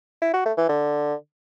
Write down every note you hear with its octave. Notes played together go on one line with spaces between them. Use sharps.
E4
F#4
A3
E3
D3